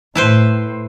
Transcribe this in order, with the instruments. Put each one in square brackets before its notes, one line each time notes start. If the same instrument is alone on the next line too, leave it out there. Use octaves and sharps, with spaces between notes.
[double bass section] A2 [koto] E4 B4 C5